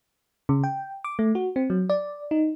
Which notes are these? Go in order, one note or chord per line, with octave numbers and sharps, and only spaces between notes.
C#3
G5
D6
A3
F#4
C4
F#3
D5
D#4